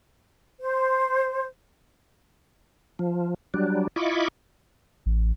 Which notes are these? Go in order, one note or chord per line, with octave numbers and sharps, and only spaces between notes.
C5
F3
F#3 G3 D4
E4 F4 D#5 B5 C#6 D6
A1